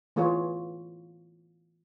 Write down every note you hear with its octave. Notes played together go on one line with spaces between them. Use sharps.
E3 A3 F4 G#4 B4 C#5